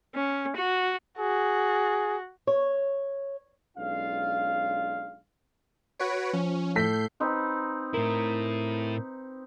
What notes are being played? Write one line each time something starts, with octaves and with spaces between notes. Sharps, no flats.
C#4
F#4
F#4 G#4
C#5
B1 G#3 C#4 D4 F4 F5
F#4 B4 C#5 D7
F3 C#4
A2 A4 G6 B6 C7
C4 D#4 B4
A2 E4 A#4